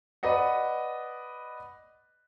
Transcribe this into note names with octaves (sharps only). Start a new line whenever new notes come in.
B4 D5 D#5 F#5